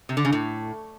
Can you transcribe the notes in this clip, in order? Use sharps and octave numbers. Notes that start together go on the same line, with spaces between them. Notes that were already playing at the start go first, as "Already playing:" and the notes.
C3
D3
C#3
A2